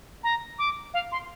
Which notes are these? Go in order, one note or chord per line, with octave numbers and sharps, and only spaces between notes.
A#5
D6
F5
C6